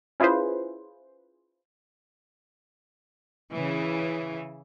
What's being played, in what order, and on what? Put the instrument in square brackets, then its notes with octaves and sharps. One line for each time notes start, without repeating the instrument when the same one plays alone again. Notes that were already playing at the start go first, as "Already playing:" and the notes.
[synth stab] C#4 E4 F4 G#4 B4 C5
[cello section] C#3 E3